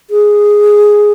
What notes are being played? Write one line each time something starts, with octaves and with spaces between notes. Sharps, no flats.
G#4